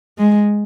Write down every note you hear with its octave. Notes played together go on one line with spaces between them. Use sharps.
G#3